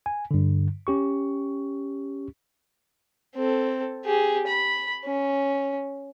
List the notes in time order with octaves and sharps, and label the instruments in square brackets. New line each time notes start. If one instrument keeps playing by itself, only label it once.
[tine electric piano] G#5
G2 D3
C#4 G4 C#6
[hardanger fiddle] C4 A4
G4 G#4
B5
C#4